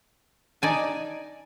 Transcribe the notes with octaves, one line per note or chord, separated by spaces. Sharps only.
D#4 D5 G#5 A5